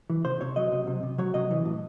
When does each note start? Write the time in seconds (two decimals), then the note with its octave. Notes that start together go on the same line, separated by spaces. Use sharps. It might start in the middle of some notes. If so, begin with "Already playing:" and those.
0.10 E3
0.25 C3 C5
0.41 C3 C#5
0.56 F#3 D#5
0.72 C3
0.87 C3
1.03 C3
1.18 F#3 C#5
1.34 C3 D#5
1.51 E3
1.65 A2